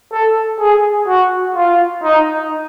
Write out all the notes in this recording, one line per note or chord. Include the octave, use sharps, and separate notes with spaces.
A4
G#4
F#4
F4
D#4